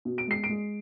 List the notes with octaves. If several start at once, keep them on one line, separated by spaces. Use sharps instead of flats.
B2
D7
G#3 C7
D7
G#3